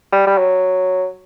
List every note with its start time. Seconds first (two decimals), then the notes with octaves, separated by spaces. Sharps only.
0.12 G3
0.27 G3
0.38 F#3